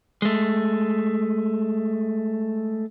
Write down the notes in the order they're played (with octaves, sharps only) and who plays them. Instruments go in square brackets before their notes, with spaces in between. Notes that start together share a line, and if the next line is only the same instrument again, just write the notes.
[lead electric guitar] G#3 A3